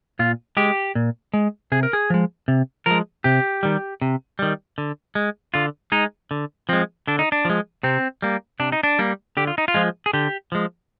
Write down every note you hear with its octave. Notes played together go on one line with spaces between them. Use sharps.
A#2 F4
G#3 G4
A#2
G#3
C3 G#4
A#4
G#4
F3 G#3
C3
F3 G#3 A#4
C3 G4
D#3 G3
C3
D#3 G3
D3
G#3
D3 F4
G#3 D#4
D3
F3 G#3 C4
D3 D4
D#4
D4
F3 G#3
C3 C4
G3 A#3
C3 D4
D#4
D4
G3 A#3
D3 G4
F4
D#4
F4
F3 G#3
G#4
D3 G4
F3 G#3